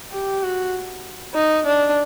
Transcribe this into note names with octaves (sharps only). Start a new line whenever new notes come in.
G4
F#4
D#4
D4